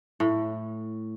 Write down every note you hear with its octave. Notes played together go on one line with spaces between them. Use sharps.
A2